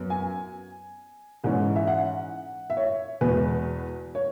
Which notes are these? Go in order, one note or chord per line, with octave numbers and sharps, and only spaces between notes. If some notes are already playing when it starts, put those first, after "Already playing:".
Already playing: F#2 F#3 B3
G#5
G#2 E3 G#3 C#4
E5
F#5
E5
C#5
E2 B2 G#3 B4
C#5